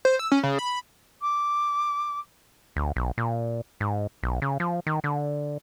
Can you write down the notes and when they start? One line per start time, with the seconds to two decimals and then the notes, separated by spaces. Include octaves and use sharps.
0.05 C5
0.19 E6
0.32 C#4
0.43 C#3
0.59 B5
1.20 D6
2.76 D2
2.96 B1
3.18 A#2
3.80 G#2
4.23 B1
4.42 C#3
4.60 F3
4.87 D#3
5.04 D3